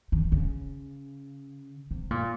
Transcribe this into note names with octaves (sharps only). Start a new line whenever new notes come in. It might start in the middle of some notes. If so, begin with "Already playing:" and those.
D#3
C#3
C3
A#2